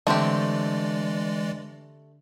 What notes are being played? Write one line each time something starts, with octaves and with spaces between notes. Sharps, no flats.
D3 E3 G#3 A3 C4 D4 G4 D5